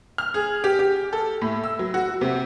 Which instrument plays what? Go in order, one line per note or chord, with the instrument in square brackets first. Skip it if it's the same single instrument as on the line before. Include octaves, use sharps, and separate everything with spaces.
[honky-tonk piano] F6
G#4
G4
G4
A4
A2
E6
F#3
F#4
C3